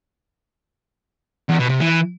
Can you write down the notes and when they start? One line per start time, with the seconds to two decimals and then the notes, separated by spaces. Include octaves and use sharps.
1.49 E2
1.59 B2
1.69 C3
1.80 E3